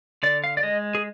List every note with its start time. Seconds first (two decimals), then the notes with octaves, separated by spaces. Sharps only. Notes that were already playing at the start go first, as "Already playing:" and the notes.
0.23 D3 D5
0.44 F5
0.57 D5
0.63 G#3 D#5
0.95 G#4